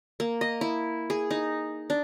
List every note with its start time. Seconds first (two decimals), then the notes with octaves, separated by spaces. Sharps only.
0.20 A#3
0.41 D#5
0.61 E4
1.10 G#4
1.30 D#4
1.90 D4